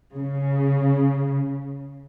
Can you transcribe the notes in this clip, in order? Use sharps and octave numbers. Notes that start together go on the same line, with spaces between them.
C#3